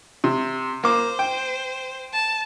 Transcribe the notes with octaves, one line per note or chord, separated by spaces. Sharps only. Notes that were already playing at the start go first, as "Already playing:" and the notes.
C3
A#3 C5 D6
G5
A5